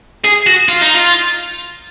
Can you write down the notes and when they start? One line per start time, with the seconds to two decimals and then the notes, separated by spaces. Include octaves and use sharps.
0.25 G#4
0.47 F#4
0.68 F4
0.81 D#4
0.94 F4